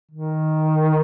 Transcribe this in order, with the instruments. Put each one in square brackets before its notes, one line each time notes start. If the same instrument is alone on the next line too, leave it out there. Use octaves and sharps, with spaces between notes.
[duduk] D#3